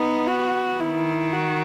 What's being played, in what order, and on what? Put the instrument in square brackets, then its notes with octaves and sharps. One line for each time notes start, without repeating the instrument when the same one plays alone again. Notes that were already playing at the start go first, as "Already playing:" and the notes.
Already playing: [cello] B3 [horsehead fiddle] D#4
[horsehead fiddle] F#4
[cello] D#3 [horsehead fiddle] E4
[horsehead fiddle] F#4